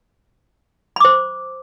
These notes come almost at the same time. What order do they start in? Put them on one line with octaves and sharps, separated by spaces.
B5 D6 C5